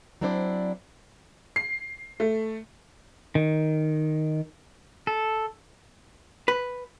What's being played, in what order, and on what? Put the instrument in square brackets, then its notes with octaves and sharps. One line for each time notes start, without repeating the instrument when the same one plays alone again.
[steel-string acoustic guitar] F#3 C4 D4 E4 C5 D5
[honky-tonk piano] C7
A3
[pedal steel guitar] D#3
A4
[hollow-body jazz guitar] B4